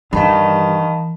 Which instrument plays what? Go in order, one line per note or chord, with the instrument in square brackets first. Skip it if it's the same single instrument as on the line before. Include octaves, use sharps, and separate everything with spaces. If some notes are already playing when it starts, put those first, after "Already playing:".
[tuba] G2 [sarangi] D#3 [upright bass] E3 [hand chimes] F5 A5 B5